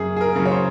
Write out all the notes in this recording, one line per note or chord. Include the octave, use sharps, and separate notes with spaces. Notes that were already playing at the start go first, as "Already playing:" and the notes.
Already playing: F#2 C#3 G#4
G#4
A#4
C#3 F#3
C#5
C5